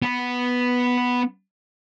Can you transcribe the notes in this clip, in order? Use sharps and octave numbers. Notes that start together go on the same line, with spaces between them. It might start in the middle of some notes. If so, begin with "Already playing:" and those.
B3 B4